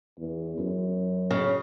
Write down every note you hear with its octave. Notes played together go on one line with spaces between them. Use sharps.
E2
F#2
C#3